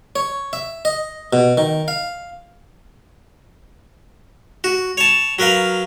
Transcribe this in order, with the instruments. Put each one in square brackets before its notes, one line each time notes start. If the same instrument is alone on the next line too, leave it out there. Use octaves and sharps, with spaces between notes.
[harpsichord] C#5
E5
D#5
B2
D#3
F5
F#4
C#5 A5
F#3 A#4 B4 F5